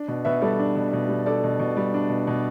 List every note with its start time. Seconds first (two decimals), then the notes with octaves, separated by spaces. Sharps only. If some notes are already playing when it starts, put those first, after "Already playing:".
Already playing: D4
0.08 B2
0.25 B2 B4 E5
0.42 G3 A4 D5
0.59 D4
0.76 B2
0.93 B2
1.09 G3
1.26 D4 A4 D5
1.44 B2
1.59 B2
1.77 G3
1.94 D4
2.10 B2
2.27 B2